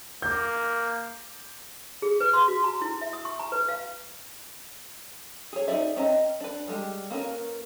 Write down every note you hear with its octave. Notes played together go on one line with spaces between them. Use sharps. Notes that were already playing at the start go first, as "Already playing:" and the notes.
A#3 D6 G6
G#4
B4
C6
F#4
A#5
E4
E5
D#6
C#6
A#5
B4
F5
G#4 C#5
D#4 G#4 C5 D5 E5
C4 C#4 D#5 A#5
D4 B4
G3 G#3 G4
A#3 B3 C#4 A#4